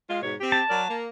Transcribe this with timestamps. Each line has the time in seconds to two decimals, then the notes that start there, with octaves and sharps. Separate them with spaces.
0.09 G#3 F4
0.22 G#2 B2 C#5
0.40 C4 G4
0.52 A5
0.69 F#3 A#4 D5
0.88 A#3